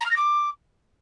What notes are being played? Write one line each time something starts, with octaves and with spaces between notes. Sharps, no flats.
A#5
F6
A#6
D6